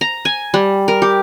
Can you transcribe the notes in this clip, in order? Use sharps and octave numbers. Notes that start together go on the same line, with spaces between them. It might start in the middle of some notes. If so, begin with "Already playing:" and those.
A#5
G#5
G3
A#4
G4